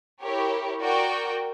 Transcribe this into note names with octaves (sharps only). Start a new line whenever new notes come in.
E4 G4 A#4 C#5
F#4 A#4 D5 G5